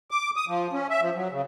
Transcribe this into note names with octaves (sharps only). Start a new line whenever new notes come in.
D6
D#6
F3
C#4
E5
F3
F#3
C#3